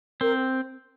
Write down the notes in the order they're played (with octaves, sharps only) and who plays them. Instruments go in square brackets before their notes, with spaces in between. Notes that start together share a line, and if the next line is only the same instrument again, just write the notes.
[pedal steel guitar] C4 [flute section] A#4